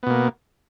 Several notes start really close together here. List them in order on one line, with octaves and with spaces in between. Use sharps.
B3 B2 A#3